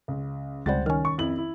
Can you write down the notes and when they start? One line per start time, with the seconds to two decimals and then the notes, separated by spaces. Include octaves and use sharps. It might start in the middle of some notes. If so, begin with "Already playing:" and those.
0.08 C#2
0.66 C#2 C3 G3 C5 F#5 A6
0.86 D#3 C#4 F6
1.05 C#6
1.18 F2 E4 F#7
1.38 E4